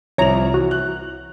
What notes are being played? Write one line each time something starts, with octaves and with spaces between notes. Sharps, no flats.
C2 F3 C#5 A#5 F7
E3 F#4
F#6